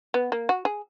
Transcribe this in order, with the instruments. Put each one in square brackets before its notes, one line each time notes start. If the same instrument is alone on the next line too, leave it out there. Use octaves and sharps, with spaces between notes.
[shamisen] B3
A#3
F#4
G#4